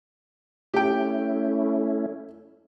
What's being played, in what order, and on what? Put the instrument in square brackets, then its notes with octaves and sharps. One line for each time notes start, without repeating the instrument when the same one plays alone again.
[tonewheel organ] A3 C#4 E4 [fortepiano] G4 G5